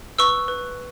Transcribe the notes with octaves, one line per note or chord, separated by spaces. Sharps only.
B4 C#6 E6
B4